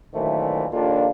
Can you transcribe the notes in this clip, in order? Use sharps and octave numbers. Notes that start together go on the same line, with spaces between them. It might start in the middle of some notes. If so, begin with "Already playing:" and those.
F#2 A#2 D#3 E3 A3 C5
A#1 D#2 A#3 D4 F4 A4